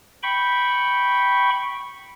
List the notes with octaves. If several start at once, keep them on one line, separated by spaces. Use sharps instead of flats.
G5 B5 C#6